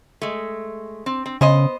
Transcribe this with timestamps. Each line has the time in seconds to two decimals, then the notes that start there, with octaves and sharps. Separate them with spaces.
0.22 G#3 A3
1.06 C4
1.26 C4
1.41 C#3 B3 C5 D#5